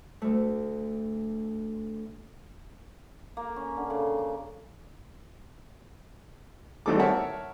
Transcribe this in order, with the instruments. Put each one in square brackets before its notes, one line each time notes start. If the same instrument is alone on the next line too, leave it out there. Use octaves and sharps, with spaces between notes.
[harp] D2 A3
[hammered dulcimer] A#3
C#4
D3
C#3
D6
[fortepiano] G#1 D#3 G3 A3 A4 D6
A#4 C#5 E5 F#5 A5